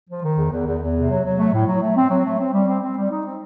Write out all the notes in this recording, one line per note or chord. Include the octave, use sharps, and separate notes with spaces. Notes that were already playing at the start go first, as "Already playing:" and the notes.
F3
D#3
E2
E2
E2
E2
C3
F#3
F#3
A3
A2
F#3
A3
C4
F#3
A3
C4
G3
C4
C4
G3
D#4
C4